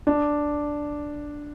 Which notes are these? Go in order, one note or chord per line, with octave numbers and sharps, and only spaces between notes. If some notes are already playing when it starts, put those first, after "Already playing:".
D4